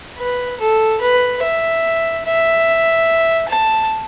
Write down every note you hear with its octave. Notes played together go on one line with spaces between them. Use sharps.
B4
A4
B4
E5
E5
A5